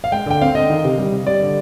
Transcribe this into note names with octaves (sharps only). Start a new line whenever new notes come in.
F5
G#3 G5
D3 G5
C4 F5
D3 D#5
D#3
C3
G3
C3
G3 D5
D3